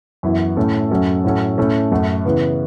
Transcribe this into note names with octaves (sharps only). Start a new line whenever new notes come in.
F#2 E3 B3 E4
A2 A3 C#4 A4
F#2 F#3 C#4 A4
A2 F#3 C#4 A4
A2 A3 C#4 A4
F#2 F#3 A3 F#4 A4
C#3 E3 B3